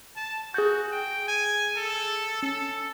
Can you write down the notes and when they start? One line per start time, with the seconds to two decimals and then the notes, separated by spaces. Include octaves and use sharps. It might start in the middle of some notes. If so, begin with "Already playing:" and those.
0.16 A5
0.54 F#4 G#4 G6
0.92 G5
1.28 G#5
1.77 A4
2.43 C#4 A4